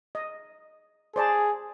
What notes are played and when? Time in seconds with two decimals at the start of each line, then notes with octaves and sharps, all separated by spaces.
0.15 D#5
1.16 G#4 C5 D5 A5